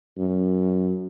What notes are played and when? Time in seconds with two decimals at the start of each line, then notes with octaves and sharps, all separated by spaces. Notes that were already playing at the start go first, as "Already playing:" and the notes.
0.18 F#2